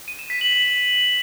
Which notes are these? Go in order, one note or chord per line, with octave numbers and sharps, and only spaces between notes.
D#7
E7
B6
F#7
F#7